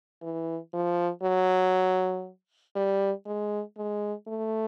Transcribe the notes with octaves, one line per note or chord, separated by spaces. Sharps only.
E3
F3
F#3
G3
G#3
G#3
A3